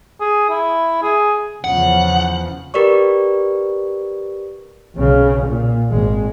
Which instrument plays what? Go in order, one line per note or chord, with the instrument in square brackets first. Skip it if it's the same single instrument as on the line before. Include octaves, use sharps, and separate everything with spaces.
[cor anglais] G#4
E4
G#4
[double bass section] E2 C#3 F3 [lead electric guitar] F#5
[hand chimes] G4 A#4 B4 D5 C#6
[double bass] B1 C#3
A#2
G#1 G#3